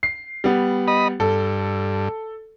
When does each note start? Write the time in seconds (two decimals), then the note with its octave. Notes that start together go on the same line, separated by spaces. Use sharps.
0.03 C7
0.44 G3 B3
0.88 D#5 B5
1.20 G2 A4